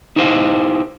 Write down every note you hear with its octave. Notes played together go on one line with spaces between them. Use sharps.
D#4 E4 G4 C5 D#5 F5